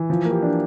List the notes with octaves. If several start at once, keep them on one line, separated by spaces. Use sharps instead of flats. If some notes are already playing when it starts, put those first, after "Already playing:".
Already playing: E3
F3
A#3
G4
D4